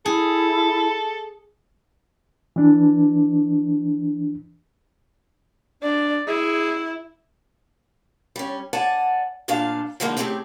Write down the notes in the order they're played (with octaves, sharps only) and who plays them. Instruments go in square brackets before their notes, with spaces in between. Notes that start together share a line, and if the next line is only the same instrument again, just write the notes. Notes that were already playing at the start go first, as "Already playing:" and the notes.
[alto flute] E4 [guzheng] G#4 [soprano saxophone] A4
[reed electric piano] E3 D4
[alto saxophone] D4 [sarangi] D5
[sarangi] E4 [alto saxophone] G#4
[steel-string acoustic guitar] G3 C#4
D5 F#5 G#5 A5
D2 A#2 D4 F4 F5 A5
D3 E3 F3 G#3 A#3 D#4
C#3 A3 B3 C4 G4 G#4